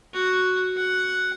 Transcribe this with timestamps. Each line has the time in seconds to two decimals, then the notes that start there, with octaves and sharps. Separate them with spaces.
0.14 F#4
0.77 F#5